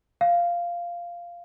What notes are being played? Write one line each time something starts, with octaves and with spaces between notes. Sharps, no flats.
F5